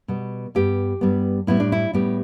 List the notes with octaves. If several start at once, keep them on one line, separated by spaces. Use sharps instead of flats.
B2 G3 B3
G2 G3 B3 G4
G2 G3 B3
A2 G3 B3 E4
D4
E4
A2 G3 B3 G4